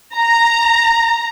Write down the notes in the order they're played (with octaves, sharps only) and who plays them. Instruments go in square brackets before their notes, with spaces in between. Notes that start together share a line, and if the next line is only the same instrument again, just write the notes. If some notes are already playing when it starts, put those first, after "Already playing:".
[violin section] A#5